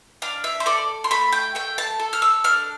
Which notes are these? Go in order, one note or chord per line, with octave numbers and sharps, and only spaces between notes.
D4 F5
E5
C5
A4 D5
C6
A3 B5
G5
A3 G5
A5
A4
F6
E6
D4 F6